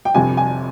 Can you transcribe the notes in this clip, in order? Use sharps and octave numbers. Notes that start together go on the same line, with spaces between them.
G5
G1 F2 C3 G#5
G#5